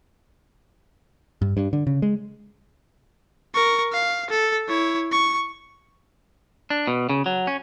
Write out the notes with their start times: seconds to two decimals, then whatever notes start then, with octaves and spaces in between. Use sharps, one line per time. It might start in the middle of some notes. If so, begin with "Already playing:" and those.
1.42 G2
1.57 G2
1.73 D3
1.87 C#3
2.02 G#3
3.54 A#4 C#6
3.92 F5
4.30 A4
4.68 E4 C#5
5.11 C#6
6.70 D4
6.87 B2
7.09 C#3
7.26 F#3
7.47 C#4